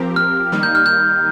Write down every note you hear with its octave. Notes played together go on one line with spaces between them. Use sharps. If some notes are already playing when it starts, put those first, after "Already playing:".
Already playing: F3 C4 G4 A#4
F6
D#3 G3 A#3 D#4
G6
F6
G6